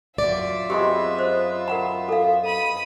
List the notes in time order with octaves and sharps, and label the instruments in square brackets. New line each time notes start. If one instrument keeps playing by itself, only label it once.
[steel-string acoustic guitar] F#2 D5 [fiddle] F4 E5
[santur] G#3 B3 C4 [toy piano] G4
[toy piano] C5
A#4 F#5 A#5
A4 F5
[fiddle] B5 D#6